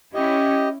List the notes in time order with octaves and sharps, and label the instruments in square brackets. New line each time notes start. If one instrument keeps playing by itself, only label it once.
[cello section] C#4 E4 [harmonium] G4 D#5